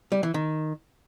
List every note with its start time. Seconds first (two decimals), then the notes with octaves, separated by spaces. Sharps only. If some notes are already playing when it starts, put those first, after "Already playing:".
0.12 G3
0.23 E3
0.34 D#3